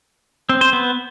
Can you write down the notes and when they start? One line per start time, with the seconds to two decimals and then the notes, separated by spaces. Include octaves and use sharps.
0.49 C4
0.61 C5
0.73 B3